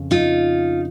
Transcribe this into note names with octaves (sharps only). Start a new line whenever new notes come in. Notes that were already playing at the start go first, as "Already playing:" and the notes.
Already playing: F2 C#3
D#4 F4